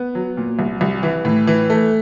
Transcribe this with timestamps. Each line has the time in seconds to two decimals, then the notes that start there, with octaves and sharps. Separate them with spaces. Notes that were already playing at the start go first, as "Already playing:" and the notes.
Already playing: B3
0.15 F#3
0.37 A#2
0.59 C2
0.81 C2
1.03 E3
1.25 A2
1.47 E3
1.70 A3